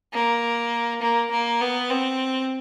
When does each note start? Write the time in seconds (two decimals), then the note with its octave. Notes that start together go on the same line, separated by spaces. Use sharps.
0.13 A#3
1.02 A#3
1.31 A#3
1.60 B3
1.90 C4